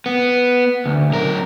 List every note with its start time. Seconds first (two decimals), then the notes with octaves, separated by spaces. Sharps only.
0.06 B3
0.86 D2
1.10 B1 A#4